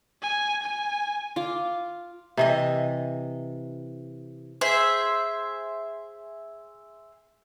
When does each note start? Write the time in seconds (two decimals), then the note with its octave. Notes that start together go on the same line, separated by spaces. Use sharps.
0.22 G#5
0.63 G#5
1.36 F4 D6
2.37 C3 E3 D#5
4.61 G#4 C5 E5